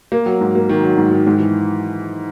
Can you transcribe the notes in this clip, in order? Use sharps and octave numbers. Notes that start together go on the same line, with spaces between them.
A#3
F#3
G#2
A#3
D#3
F#3
G#2
D#3
G#2
E3